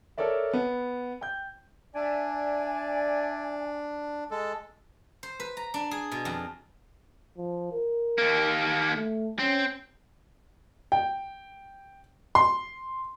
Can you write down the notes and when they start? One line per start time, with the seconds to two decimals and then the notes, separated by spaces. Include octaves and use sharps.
0.18 A4 A#4 C#5 D5 E5
0.53 B3
1.21 G5 G6
1.95 D4 D5 E5 G#5
4.31 G#3 A4
5.23 C5
5.40 B4
5.57 A#5
5.74 D4
5.91 G#4
6.11 B2
6.25 F2
7.38 F3
7.72 A#4
8.18 D#2 A#3
8.95 A3
9.39 C4 C#4
10.92 G5
12.35 C6